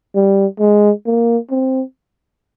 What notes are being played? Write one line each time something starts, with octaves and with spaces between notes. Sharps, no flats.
G3
G#3
A#3
C4